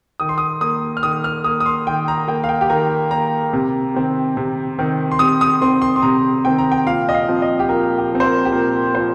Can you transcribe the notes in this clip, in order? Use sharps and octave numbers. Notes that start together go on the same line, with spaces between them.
D#3 D#6
C6
D#6
A#3 D#6
F6
D#3 D#6
F6
A#3 D#6
D#6
C6
D#3 G5
A#5
A#3 G5
F5
G5
G4
D#3 A#4
A#3 A#5
C3
D#3 C4
C3
D#3 C4
C6
C3 D#6
D#6
D#3 C4 C6
C6
C6
C3 A#5
D#3 C4 G5
A#5
G5
A#2 F5
D#5
F5
F3 C4
D#5
G4
A#2 A#4
G4
F3 C4
C5
A#4
G4
A#2 A#4
F3 C4 C5